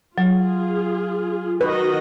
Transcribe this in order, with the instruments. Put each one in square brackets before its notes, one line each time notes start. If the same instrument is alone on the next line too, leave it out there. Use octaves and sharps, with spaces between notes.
[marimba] F#3 [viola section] F4 G#4
[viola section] D#3 F#4 D#5 [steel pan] B4